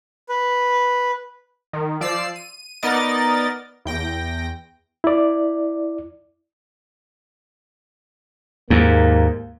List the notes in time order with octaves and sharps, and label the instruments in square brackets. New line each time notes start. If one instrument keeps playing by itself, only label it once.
[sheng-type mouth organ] B4
[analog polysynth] D#3
F3 D5 E6 C7
D#7
B3 D#4 A#4 D5 D#5 A6
E2 G5 A#6
[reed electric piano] E4 D5
[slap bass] D#2 G#2 [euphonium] A#3